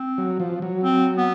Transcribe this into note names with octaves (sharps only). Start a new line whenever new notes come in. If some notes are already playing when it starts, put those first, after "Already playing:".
Already playing: C4
F#3
F3
F#3
C4
B3